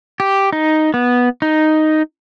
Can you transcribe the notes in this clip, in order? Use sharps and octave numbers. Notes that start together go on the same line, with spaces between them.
G4
D#4
B3
D#4